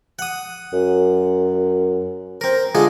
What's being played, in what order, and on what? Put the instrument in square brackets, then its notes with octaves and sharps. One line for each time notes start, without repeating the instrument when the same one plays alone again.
[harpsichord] F#5 D#6
[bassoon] F#2
[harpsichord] C4 A#4
[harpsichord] D3 G#3 G#4 [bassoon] F4